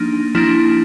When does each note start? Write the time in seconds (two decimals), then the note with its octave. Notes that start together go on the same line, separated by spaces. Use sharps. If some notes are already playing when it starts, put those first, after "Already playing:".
Already playing: F3 A#3 D4 D#4
0.35 F3 A#3 D4 E4